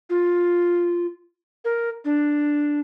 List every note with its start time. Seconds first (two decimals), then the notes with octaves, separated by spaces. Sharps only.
0.10 F4
1.65 A#4
2.05 D4